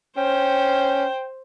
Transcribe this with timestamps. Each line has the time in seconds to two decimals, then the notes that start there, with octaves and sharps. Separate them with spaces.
0.17 C#4 C5 G5